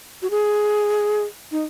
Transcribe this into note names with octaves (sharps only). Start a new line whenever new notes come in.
F#4
G#4
D#4